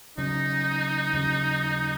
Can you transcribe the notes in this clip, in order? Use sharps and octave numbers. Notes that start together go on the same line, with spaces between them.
D#2 C#3 F#3 C#4 D#4
D#2 C#3 F#3 C#4